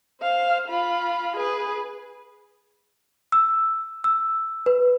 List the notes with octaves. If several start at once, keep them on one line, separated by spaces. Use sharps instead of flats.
C5 F5
F4 B5
G#4 B4
E6
E6
B4